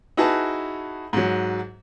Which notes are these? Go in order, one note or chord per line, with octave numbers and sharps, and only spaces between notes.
D#4 E4 F#4 G#4 B4 A5
G#2 F#3